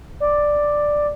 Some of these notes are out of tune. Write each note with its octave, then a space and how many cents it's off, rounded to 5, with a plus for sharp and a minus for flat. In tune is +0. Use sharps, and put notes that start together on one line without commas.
D5 +5